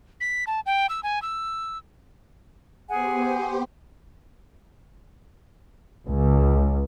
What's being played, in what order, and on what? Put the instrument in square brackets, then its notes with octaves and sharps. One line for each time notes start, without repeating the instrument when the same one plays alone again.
[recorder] B6
A5
G5
E6
G#5
E6
[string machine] B3 G4 C5 [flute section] G#4 F#5 G#5
[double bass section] C#2